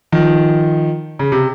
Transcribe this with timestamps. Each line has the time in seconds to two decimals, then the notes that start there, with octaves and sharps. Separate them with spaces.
0.12 D#3 F3
1.19 C#3
1.32 C3